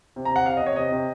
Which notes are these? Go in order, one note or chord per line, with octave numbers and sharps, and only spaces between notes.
C3
A#5
C3 F#5
C3 F5
C3 D#5
C#5
C3 D#5
C3